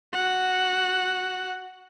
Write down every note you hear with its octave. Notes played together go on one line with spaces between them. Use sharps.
F#4 F#5